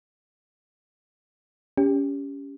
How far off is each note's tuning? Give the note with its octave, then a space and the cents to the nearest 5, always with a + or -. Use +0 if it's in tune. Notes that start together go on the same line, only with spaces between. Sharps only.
C#4 +20 G4 +20